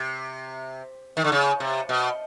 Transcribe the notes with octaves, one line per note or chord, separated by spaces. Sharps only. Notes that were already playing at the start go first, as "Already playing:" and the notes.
Already playing: C3
D#3
D3
C#3
C3
B2